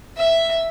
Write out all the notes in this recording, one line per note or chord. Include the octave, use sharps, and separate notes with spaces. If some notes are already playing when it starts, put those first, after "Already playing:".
E5